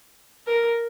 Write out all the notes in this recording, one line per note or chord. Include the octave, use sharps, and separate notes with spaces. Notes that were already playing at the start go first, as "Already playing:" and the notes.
A#4